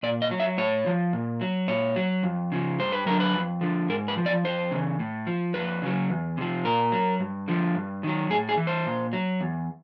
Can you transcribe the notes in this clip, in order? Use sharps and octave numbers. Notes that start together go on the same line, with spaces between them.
A#2 D5
D#5
F#3
E5
A2 C#5
F3
A#2
F#3
A#2 C#5
F#3
F2
C#3 F3
G2 C5
B4
D3 F#3 A#4
B4
F2
D3 F3
G#2 A#4
B4
F3
D5
F2 C5
C#3 E3
A2
F3
F2 B4
C#3 F#3
E2
C3 F3
A#2 A#4
F#3
G2
D3 F3
G2
D#3 F#3
A2 G#4
G#4
E3
C5
A#2
F#3
E2